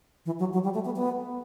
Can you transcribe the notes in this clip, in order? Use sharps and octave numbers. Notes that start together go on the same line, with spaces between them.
E3
F#3
F#3
G3
A3
B3
B3